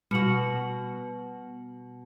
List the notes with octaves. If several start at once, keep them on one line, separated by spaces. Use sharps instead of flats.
B2 G3 F#4 C#7 F#7